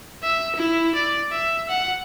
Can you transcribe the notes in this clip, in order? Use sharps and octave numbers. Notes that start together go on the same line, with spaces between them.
E5
E4
D5
E5
F#5